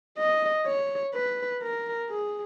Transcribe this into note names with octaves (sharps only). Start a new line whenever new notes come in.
D#5
C#5
B4
A#4
G#4